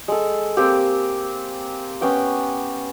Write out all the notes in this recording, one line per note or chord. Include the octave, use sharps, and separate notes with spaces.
G#3 A4
A#3 C4 G4
B3 C#4 G5 D6